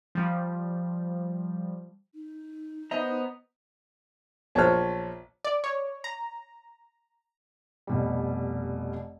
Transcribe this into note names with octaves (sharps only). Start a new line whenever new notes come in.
F3 G3
D#4
B3 C5 D#5 A#5
A#1 C5 C#5 A5 F6
D5
C#5
A#5
F1 B2 G3